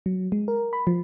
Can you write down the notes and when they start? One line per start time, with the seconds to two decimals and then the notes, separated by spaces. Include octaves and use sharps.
0.06 F#3
0.32 G#3
0.48 A#4
0.73 B5
0.87 F3